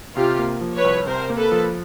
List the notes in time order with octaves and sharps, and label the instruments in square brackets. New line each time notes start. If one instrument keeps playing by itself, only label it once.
[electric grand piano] C3 [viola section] F4 G4
[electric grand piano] A#3
F3
[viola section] B4 C#5
[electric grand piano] C2
[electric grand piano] C3 [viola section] A#4 C5
[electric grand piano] A#3
[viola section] A4 B4
[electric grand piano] F3